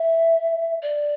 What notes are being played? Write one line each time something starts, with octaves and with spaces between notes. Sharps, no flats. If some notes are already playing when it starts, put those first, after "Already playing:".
Already playing: E5
D5